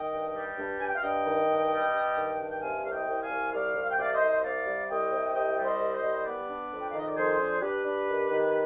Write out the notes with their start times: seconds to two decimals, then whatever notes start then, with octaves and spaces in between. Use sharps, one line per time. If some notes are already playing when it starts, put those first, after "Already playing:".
Already playing: D#3 D#5 G5
0.11 G2
0.34 G3
0.57 G2
0.80 G2 G#5
0.87 G5
0.95 F5
1.02 G2 D#5 G5
1.25 D#3
1.48 G2
1.71 G3
1.94 G2
2.16 D#3
2.39 G2
2.51 G5
2.61 C3 F5 G#5
2.84 C2 F5
2.91 D#5 G5
3.07 C2
3.22 F5 G#5
3.30 C2
3.52 C2 D5 F5
3.75 C2
3.83 F5
3.91 G5
3.97 C3 D5 F5
4.13 C5 D#5
4.21 C2
4.43 C3 D5 F5
4.66 G3
4.89 C2 D#5 G5
5.11 C3
5.34 C2 D#5 G5
5.57 G3
5.64 C5 D#5
5.80 C2
5.95 C5 D#5
6.02 G3
6.25 B3 B4 D5
6.48 D4
6.71 F2
6.80 G5
6.89 F5
6.93 D#3
6.98 D#5
7.07 D5
7.16 F2 G#4 C5
7.39 D4
7.61 D4 G4 B4
7.84 D4
8.07 D#3
8.30 D#3